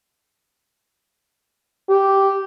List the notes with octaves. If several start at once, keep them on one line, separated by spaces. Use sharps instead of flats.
G4